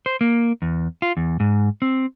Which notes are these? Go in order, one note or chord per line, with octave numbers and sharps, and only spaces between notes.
C5
A#3
E2
F4
E2
G#2
C4